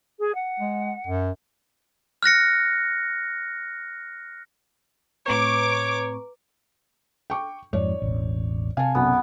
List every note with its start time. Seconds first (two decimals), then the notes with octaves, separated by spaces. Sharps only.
0.18 G#4
0.34 F#5
0.60 G#3
1.07 F#2
2.23 F6 F#6 A#6 C#7
5.26 A2 C4 B4 C#5 A#5 C#6 D6
7.30 G5 C#6 D6
7.73 F2 G#2 C#5 D5
8.02 E1 A1
8.77 C3 F5 G#5 A5
8.95 B1 F#2 B3